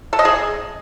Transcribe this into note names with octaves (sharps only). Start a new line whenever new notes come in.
A4
D#5
G#4